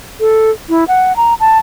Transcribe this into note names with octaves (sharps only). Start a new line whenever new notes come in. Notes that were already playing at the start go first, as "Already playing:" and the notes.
A4
E4
F#5
A#5
A5